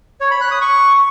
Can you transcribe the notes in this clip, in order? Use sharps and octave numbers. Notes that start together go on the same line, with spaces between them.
C#5
B5
F#6
D#6
C#6